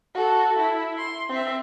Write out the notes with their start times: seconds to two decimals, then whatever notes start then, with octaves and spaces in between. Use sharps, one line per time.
0.15 F#4 A4
0.58 E4
0.98 C6
1.29 C4 E5